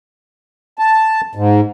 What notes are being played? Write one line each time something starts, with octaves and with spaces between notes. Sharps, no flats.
A5
G#2